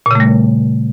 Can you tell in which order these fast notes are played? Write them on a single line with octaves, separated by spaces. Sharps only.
A#2 C#3 A3 G3